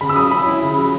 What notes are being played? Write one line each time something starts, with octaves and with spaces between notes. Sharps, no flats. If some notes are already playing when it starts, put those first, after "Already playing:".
C#3 B5
E6
F#3 D#6
C#4 B5
E4
C#3
F#3